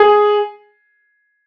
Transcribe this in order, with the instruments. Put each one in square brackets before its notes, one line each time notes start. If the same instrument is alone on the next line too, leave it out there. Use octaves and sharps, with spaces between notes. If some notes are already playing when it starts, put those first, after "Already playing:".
Already playing: [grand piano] G#4